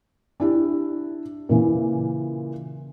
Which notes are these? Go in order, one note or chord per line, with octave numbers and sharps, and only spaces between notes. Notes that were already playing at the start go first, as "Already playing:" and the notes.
D4 E4 G4
A#2 C#3 E3